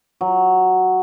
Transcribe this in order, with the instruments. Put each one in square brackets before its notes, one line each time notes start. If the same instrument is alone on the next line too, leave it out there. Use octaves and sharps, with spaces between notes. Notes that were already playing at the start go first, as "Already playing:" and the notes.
[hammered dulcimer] F#3